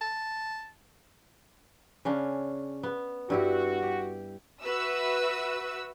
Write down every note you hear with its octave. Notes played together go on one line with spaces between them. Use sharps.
A5
C#3 C#4 D4
B3
G2 E4 F#4 G4
G4
F#4 B4 E5 E6